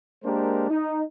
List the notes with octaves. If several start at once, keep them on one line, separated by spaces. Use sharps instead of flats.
G#3 A#3 D4 G4 A#4 C5
D#4